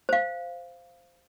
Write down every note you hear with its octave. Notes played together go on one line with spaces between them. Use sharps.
C5 F5